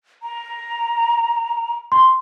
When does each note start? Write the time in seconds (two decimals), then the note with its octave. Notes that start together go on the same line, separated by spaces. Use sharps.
0.23 A#5
1.92 C6